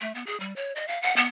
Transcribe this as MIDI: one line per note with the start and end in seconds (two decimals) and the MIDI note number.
0.01 0.14 57
0.15 0.23 59
0.26 0.39 68
0.40 0.55 55
0.56 0.72 73
0.76 0.87 75
0.88 1.00 77
1.02 1.15 78
1.16 1.27 59